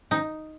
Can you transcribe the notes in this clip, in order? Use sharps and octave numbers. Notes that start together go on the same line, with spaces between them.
D#4